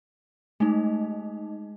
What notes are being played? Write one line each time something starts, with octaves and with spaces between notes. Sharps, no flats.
G#3 A3 D#4